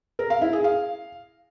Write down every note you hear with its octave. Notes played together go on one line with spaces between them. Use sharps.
A#4
F5
E4
G#4
F5